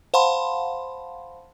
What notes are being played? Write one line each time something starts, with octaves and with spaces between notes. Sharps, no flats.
C5 F5 F#5 A5 B5 C6